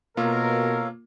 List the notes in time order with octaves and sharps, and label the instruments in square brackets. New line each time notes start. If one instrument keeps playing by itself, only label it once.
[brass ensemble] B2 A#4 [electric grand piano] A#3 F4 [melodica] A4 C#5 F5